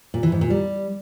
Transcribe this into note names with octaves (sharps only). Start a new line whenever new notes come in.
A#2
E3
G#2
A#2
G3